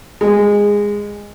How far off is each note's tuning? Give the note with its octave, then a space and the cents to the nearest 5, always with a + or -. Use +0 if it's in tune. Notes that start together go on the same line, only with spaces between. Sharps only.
G#3 -15